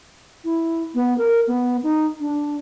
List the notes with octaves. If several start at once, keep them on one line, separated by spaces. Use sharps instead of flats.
E4
B3
A#4
B3
D#4
D4